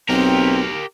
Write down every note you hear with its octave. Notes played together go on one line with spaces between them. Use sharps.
B1 C4 G4 A#4